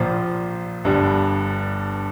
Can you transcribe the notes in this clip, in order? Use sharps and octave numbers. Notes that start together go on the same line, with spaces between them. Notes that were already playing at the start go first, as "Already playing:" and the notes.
Already playing: A#1 A#2 F3
G1 G2 D3 G3